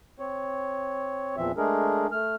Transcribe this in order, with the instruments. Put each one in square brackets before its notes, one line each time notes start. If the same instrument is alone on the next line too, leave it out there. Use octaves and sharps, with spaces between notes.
[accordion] C4 C#5
E2 A#2 E3 F3 C4 E5
G#3 A3 D4 G#4 A#4
A3 F6